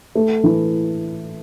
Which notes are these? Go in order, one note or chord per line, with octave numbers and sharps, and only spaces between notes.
A3
E3